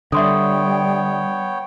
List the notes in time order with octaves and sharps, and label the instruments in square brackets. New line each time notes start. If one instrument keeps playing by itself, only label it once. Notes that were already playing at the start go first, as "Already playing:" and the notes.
[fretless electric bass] D3 [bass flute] G3 [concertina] B3 C#5 G5 [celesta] E5 C6 D#6